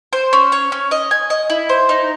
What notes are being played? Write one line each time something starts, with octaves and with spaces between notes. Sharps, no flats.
C5
C#4
C#5
C#4
D#5
G#5
D#5
E4
C5
D#4